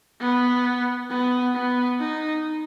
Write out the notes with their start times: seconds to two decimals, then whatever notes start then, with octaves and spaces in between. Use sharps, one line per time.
0.20 B3
1.10 B3
1.54 B3
2.00 D#4